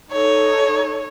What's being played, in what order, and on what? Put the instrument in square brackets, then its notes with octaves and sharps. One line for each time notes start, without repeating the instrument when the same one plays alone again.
[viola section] D#4 A4 [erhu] C#5